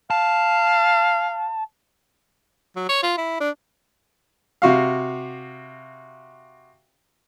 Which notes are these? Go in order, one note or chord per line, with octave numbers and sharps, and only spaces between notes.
F5 A5
F#3
C#5
F4
E4
D4
C3 F#4 F5